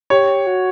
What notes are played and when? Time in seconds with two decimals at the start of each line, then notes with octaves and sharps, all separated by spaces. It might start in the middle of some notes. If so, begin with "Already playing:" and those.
0.10 G4 C#5
0.47 F#4